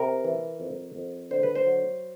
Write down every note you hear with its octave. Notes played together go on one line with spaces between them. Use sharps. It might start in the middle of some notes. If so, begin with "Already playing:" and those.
Already playing: C3 A#4
E3
F2
F2
D3 C5
B4
C5
F#3